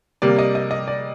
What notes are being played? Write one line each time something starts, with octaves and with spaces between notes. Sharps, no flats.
C3 G3 A#3 D5
D#5
D#5
D#5
D5